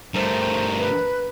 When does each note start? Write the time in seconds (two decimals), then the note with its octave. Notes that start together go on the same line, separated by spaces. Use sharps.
0.15 G2 A3 A#4 C5
0.78 B4